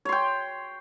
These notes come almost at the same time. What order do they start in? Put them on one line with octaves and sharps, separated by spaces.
C#5 C6 G5